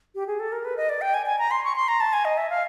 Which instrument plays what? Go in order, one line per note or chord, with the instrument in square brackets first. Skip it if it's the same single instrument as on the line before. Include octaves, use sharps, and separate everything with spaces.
[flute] G4
G#4
A4
A#4
B4
D#5
D5
G5
G#5
G#5
A#5
C6
C#6
C6
A#5
A5
G#5
D#5
E5
F5